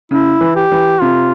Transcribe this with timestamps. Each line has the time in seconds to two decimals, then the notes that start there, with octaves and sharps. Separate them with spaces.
0.11 C#3 E4
0.41 E3
0.56 G4
0.72 E3
1.01 C3 F4